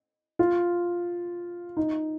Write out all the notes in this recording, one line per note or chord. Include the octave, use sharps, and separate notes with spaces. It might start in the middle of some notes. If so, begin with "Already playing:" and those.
F4
D#4